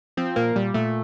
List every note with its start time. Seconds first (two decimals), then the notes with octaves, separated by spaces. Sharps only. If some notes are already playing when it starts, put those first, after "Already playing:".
0.17 F3 C4
0.36 A#2 A#3
0.55 A#2 G3
0.74 A#2 A3